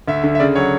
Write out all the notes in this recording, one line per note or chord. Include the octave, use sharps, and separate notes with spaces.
D2 E5
D3
E5
C#3 D5
F#3 C#5